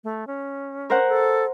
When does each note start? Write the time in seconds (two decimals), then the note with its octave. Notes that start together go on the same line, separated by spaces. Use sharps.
0.04 A3
0.27 C#4
0.90 A#4 C5 F#5
1.08 A4